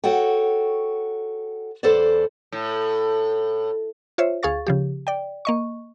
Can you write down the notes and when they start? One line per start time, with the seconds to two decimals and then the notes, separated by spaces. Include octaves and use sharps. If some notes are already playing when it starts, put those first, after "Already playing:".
0.04 F#4 A4 C#5 F#5 G5
1.83 E2 A4 B4 C5 D5
2.52 A2
4.18 F4 C5 C#5 E5
4.43 D2 G#4 F5 C#6 A6
4.67 C#3 F3 G4
5.07 D5 G5
5.45 A#3 D#5 C#6